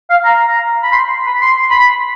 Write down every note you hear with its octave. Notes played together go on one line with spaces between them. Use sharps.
F5
A#5
B5
C6
B5
C6
B5